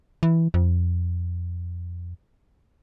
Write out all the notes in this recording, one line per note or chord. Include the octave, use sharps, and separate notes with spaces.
E3
F2